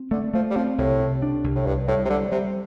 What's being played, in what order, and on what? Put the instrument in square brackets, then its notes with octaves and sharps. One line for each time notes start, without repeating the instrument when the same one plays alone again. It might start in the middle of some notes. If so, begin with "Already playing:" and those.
Already playing: [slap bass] C4
[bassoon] D3 [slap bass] A3
[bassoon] F3 [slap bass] A3
[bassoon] G3
[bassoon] F3 [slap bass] C4
[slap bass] C2 [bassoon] A2
[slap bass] C3
D4
C2
[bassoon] A2
[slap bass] C2 [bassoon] G2
[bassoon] A2 [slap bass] G3
[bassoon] C3
[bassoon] D3 [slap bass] G3
[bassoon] C3 [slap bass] G3